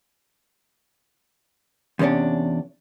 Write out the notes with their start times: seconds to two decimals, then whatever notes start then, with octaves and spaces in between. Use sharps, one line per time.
1.99 E2 C3 A#3 C#4 D4